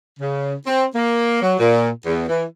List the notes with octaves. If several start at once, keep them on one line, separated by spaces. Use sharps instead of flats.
C#3
C4
A#3
F#3
A#2
E2
E3